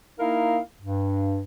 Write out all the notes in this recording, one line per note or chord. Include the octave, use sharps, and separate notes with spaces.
A#3 D#4 E4 A#4 F5
G2